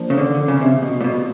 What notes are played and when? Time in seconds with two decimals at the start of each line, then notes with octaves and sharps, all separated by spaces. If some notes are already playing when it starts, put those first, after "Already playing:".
Already playing: F3 A#3 D4
0.10 C#3
0.17 D3
0.35 D3
0.48 C#3
0.61 C3
0.82 B2
1.01 A#2
1.04 B2